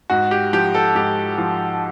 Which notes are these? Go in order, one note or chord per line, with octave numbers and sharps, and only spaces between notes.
G#2 F#4
G4
F3 G4
A4
G#2 G4
F3